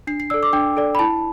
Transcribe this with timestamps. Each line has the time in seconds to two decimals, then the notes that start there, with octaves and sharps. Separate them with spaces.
0.07 D4 C7
0.20 C7
0.30 A4 D5 E6
0.43 D6
0.53 D4 G5
0.77 A4 D5
0.95 B5
0.99 E4 A5